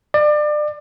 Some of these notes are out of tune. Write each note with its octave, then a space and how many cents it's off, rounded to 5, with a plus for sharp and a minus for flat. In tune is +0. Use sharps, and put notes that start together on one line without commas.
D5 +30